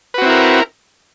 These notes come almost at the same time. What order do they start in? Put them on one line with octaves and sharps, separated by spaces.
B4 F#4 C4 E4 A#4